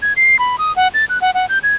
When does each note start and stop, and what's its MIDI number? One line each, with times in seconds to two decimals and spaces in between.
0.02 0.13 92
0.17 0.39 96
0.39 0.56 83
0.58 0.75 87
0.76 0.88 78
0.94 1.05 93
1.09 1.21 90
1.22 1.31 78
1.34 1.46 78
1.49 1.59 91
1.63 1.75 92